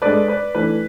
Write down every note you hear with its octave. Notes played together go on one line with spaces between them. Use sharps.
G#3 D4 A4 B4 D5
B4 D5
E3 A3 D4 B4